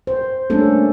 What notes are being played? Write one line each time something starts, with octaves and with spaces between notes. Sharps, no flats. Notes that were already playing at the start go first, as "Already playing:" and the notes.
C5
G3 A3 A#3 C#4 D4 A4